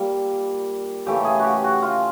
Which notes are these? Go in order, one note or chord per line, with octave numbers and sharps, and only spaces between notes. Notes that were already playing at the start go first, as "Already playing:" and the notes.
Already playing: A#2 G3
C#3 E3 A3 G4
G#4
F#4 G4
F#4
F4